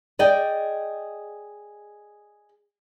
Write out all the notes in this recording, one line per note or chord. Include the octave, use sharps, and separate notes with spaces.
G#4 D5 D#5 G5